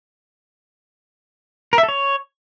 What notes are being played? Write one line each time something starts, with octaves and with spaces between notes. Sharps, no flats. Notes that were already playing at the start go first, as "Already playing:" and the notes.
A#4
E5
A4
C#5